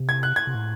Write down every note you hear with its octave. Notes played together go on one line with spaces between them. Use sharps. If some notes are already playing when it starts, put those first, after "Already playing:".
Already playing: C3
G#6
F#6
G#6
C3
A2